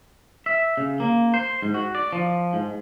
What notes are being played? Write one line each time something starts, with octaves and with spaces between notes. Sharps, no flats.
E5
C#3
A#3
C5
G#2
F#4
D5
F3
G#2